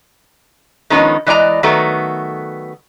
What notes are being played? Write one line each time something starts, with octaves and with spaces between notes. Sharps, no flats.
D#3 F3 G#3 B3 C#4 D#4
E3 G#3 D5 D#5 A#5
D#3 F#3 A3 B3